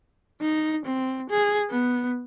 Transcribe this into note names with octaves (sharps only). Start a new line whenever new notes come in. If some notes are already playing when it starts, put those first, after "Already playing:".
D#4
C4
G#4
B3